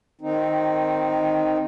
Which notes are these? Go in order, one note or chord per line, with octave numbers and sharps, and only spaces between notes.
D#3 C4 D#4